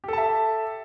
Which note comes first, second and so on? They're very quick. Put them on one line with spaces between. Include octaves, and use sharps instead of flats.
G4 A4 A5 E5